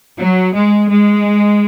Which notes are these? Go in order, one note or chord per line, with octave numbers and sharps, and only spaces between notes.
F#3
G#3
G#3